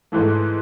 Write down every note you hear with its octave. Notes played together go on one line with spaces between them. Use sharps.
G#2 E3 A3